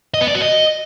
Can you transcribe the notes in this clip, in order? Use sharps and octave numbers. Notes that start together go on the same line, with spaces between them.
D#5
B3
D5
F#4
D#5